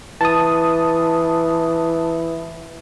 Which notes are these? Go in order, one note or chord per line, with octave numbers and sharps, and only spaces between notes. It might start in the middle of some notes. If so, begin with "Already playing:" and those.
E3 A5 D#6